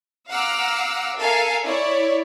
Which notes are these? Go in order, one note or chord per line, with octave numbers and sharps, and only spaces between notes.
F5 F#5 A#5 D6 E6 F6
A4 A#4 E5 F5 G#5
E4 C#5 D5